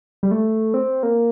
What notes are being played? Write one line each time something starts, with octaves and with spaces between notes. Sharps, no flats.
G3
A3
C4
A#3